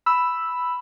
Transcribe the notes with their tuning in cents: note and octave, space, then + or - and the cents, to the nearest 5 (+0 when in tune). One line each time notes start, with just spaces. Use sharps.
B5 +0 E6 +0